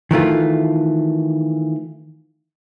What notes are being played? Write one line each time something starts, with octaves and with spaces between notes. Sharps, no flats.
D#3 E3 A3 F4